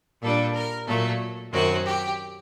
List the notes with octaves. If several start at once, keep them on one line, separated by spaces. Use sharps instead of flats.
A#2 G3 D4 A4
A#4
A#2 F#3 A3 A4
F#2 D#3 F#3 C4 F#4
G4